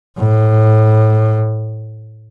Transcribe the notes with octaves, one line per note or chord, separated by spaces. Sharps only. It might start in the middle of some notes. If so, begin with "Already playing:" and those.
A2